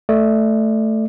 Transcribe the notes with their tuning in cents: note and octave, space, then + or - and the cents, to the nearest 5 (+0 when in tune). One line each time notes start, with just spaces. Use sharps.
A3 +0 D5 +25